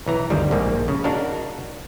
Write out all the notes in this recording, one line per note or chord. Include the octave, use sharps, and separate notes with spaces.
B1 E3 A#5
G1 D2 D#3 G3
A#1 G#2 A#3
C#3
D4 D#4 F#4 A#4 F5